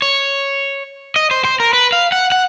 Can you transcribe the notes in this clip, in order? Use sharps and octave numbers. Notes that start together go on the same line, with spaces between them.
C#5
D#5
C5
C5
A#4
B4
F5
F#5
F#5